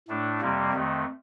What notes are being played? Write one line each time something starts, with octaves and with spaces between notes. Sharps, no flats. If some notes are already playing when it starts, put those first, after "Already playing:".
A2 A3 D4
F2 C3 G3 A#3
F2 D#3 A3